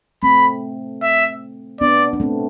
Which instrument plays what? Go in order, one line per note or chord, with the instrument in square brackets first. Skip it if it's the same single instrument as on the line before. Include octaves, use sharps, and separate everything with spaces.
[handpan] A3 C4 [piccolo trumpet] B5
[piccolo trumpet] E5
[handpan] B3 D4 [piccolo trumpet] D5
[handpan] D4
A3 C4